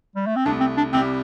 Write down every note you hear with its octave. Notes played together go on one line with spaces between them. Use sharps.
G3
A3
C4
C2 C3 A3 D4
C4
D4
C2 C3 G3 C4